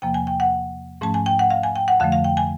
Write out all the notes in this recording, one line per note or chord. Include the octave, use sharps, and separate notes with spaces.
E2 C3 F3 A#3 G5
G#5
G5
F#5
G#2 F3 A3 C#4 A5
G#5
G5
F#5
F5
G#5
G5
F#5
F2 D3 F3 A3 F5
F5
G5
G#5